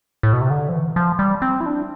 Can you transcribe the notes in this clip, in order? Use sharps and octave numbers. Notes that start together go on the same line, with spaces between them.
A2
B2
C3
D3
F3
E3
F3
G3
C4
E4
D4